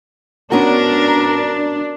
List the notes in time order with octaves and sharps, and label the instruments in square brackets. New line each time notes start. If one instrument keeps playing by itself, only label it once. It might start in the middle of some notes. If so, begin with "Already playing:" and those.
[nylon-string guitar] B3 C#4 F#4 [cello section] D4 [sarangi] A#4